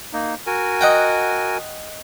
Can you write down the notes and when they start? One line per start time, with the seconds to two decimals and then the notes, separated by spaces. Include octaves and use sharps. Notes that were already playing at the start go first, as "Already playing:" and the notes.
0.13 A#3 D#4
0.47 F#4 A#4 G#5
0.81 D#5 F#5 G5